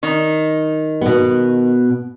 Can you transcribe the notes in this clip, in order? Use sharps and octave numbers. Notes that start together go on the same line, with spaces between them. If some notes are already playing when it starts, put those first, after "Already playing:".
D#3 D#4
B2 B3